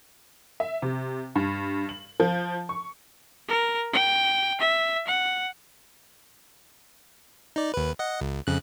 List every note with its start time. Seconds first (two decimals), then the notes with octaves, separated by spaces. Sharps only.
0.60 E5
0.82 C3
1.35 G2
1.89 F#7
2.20 F3
2.69 C#6
3.48 A#4
3.93 G5
4.60 E5
5.07 F#5
7.56 D#4 D5
7.74 D#2 B4
7.99 D#5 F#5
8.21 C#2
8.47 F2 C#3 F#6